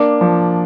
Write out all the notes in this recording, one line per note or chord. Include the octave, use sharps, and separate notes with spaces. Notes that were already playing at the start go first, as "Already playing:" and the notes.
Already playing: A#3 D4
F3